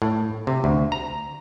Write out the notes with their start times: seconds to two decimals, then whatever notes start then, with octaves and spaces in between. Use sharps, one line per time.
0.02 A2
0.47 C3
0.64 D2
0.92 A#5